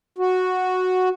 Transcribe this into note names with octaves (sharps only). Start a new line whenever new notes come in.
F#4